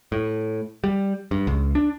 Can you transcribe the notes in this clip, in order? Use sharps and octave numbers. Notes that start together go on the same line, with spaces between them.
A2
G3
G2
C#2
D4